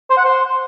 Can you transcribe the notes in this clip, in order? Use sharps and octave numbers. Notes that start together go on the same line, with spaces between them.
C5
F#5
C5